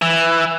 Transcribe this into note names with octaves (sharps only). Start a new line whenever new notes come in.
E3